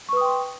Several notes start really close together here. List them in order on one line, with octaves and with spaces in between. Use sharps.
C#6 B4 D#6 G5 C6